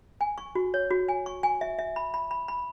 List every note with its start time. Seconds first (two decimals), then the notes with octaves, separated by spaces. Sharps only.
0.21 G#5
0.38 C#6
0.55 F#4
0.74 C#5
0.91 F#4
1.09 G#5
1.26 C#6
1.43 G#5
1.61 E5
1.79 E5
1.96 B5
2.14 B5
2.31 B5
2.48 B5